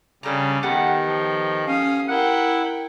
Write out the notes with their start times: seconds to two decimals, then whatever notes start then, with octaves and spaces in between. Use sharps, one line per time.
0.23 C#3 G3 D4 A4 A#5
0.63 D#3 B3 G4 A4 F#5
1.06 F3
1.67 C#4 F5 D#6
2.09 E4 A#4 F#5 G5